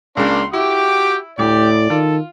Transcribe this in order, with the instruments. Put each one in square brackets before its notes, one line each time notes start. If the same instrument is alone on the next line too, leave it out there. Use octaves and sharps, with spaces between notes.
[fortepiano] C#2 C#3 [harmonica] A#3 D4 [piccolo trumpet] C6
[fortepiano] E4 [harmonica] F#4 G4 G5 [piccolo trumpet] D6
[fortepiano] D2 [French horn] A2 [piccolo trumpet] G4 [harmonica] D5 D6
[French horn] D#3 [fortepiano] F4 [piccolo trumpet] A4